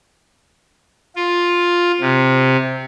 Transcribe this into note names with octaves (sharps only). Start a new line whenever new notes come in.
F4
C3